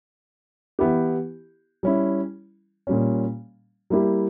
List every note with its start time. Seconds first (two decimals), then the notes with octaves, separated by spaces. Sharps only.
0.79 E3 B3 E4 G4
1.83 G3 C#4 E4
2.87 A#2 G3 C#4
3.90 G3 A#3 E4 G4